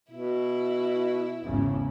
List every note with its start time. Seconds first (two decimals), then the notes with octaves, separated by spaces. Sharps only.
0.11 B2 E4
1.44 G#1 E2 C#3